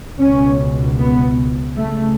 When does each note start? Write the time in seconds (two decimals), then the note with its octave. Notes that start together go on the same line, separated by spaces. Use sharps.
0.18 C#2 B2 C#4
0.98 B3
1.77 C#2 C#3 A3